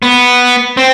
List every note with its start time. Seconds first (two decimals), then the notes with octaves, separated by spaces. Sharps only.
0.02 B3
0.77 C4